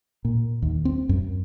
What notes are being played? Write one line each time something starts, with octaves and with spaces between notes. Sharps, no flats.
A#2
D#2
C4
F#2